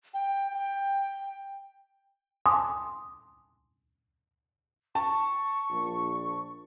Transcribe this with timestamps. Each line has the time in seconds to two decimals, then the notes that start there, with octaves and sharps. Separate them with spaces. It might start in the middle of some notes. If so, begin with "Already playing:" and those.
0.14 G5
0.53 G5
2.46 G#5 A5 C6 D6 D#6
4.95 A5 C#6
5.70 A#1